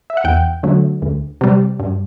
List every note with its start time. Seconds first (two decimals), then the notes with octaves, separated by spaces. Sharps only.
0.10 E5
0.17 F#5
0.24 E2 G5
0.63 D3 F#3 A3
1.02 D2
1.41 C3 G3
1.79 G2